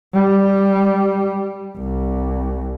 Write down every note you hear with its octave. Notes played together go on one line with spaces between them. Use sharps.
G3
C2